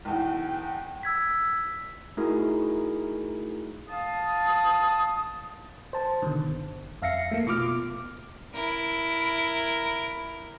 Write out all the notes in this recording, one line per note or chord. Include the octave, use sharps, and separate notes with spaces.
B1 E2 G5
E6 G#6 B6
A3 D#4 E4 F#4 G#4 A#4
F5 A5 D#6
C5 A5
B2 D3 D#3
G1
F2 E5 F5 A#6 C7 C#7
A3 A#3
B2 F4 D6 F6
E4 A#4